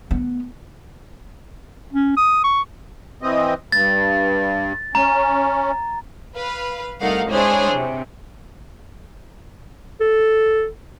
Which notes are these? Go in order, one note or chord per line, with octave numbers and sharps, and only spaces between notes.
B3
C#4
D#6
C#6
E3 C4 D#5
G2 A6
C#4 A#5
B4 F5
C2 A3 D#4 A#4 F5 F#5
G#3 D4 E4 G#4 C5 C#5
C3
A4